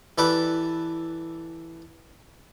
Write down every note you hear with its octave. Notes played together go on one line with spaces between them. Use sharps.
E3 G4 A4 B4 D5 D6